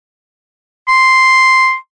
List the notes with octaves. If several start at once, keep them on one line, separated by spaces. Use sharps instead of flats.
C6